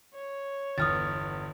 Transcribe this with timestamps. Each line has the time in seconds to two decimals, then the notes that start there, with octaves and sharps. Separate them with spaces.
0.14 C#5
0.78 G1 E2 D#6 F6 A6